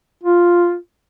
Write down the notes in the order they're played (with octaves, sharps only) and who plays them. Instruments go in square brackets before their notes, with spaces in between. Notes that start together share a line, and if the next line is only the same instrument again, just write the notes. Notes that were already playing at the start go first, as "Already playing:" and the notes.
[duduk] F4